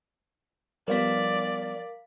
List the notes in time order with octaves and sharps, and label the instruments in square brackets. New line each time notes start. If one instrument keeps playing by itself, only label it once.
[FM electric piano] F3 G3 B3 [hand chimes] A#4 F5 B6 [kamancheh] D5